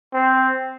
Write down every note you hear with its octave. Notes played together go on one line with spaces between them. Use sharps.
C4